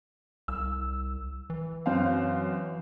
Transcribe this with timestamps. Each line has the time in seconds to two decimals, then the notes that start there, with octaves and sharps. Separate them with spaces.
0.48 C2 E6
1.50 E3
1.86 F#2 C4 F5